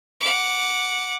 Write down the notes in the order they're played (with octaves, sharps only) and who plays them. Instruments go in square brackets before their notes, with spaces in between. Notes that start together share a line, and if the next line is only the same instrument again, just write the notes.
[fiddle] F#5 D6